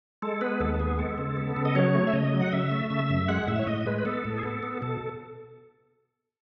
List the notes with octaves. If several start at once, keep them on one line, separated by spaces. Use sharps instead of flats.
G#3 A4
B3 B4
D#2 A4
A4
B3 G#4
G#3 A4
C#3
B3
C#3
D#5
F#3 C#5
A3
E5
C#3 D#5
F#3
F#5
C#3 E5
A3
C#3 E5
F#2
G#3 F#5
A2 E5
C#5
A2 D#5
G#3 B4
B4
B3 A4
A2
G#4
B3 A4
B3
B2 A4